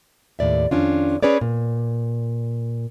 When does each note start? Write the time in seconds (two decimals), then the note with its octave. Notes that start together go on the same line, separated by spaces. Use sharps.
0.39 D#2 A2 D5 E5
0.71 F2 D#3 C#4 D4 F4
1.23 C#4 G#4 B4 C#5 D5
1.41 A#2